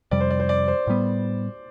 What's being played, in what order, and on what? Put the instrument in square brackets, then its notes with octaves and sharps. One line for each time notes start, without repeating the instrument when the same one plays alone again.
[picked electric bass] F2 C3 G3 [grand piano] D5
[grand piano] C5
D5
C5
D5
C5
[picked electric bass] A2 G3 B3